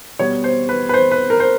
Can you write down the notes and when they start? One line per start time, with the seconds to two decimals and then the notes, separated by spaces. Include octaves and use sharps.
0.19 B2 G3 B3 C#5
0.44 C5
0.69 B4
0.89 B4
0.94 C5
1.11 B4
1.30 A#4
1.40 C5